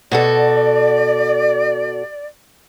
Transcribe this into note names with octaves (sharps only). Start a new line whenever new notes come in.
B2 F#4 A4 D5